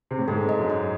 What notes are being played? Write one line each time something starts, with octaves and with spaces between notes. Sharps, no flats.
C3
A2
G#2 A4
D#5
F#2
D#5